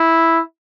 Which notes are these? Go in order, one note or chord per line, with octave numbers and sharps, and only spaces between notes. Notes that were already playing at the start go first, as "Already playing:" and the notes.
Already playing: E4